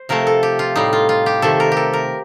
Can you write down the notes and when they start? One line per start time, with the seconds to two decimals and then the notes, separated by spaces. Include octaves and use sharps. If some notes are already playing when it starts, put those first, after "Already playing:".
Already playing: C5
0.09 C3 F3 A3 A#4
0.27 A4
0.43 G4
0.59 F4
0.76 A2 G3 D#4
0.93 F4
1.09 F4
1.26 G4
1.42 C3 D#3 A3 A4
1.60 A#4
1.72 G4
1.77 A4
1.93 A#4